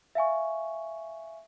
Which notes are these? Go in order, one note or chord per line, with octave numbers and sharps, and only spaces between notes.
E5 F5 G#5 C#6